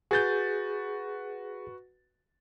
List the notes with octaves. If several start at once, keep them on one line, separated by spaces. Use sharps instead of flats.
F#4 G#4 B4 G6 A6